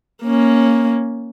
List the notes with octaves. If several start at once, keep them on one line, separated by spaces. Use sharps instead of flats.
A#3 C#4